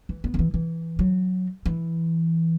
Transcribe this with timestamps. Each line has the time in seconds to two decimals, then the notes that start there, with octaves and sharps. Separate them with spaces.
0.09 E3
0.24 B3
0.34 D#3
0.39 E3
0.54 E3
0.99 F#3
1.66 E3